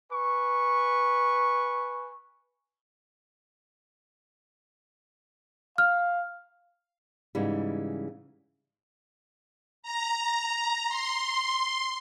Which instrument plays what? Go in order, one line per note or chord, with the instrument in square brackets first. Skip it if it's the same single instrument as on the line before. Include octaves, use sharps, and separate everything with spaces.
[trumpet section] B4 G#5 C#6
[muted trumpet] F5 [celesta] F6
[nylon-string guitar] G#2 C#3 E3 G3
[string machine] A#5
C6